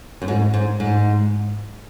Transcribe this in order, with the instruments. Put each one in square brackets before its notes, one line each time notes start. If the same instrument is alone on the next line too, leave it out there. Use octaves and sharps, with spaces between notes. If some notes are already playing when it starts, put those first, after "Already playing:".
[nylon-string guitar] F#2
G#2
G#2
G#2